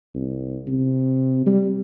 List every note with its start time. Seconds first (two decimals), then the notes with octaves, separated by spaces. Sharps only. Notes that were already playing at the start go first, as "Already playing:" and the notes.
0.15 C2
0.67 C3
1.46 G3